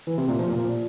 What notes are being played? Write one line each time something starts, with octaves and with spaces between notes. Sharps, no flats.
E3
C3
A#2
F3
A#2